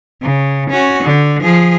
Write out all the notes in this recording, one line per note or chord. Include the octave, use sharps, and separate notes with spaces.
C#3
C#4 F#4
D3
F3 G#4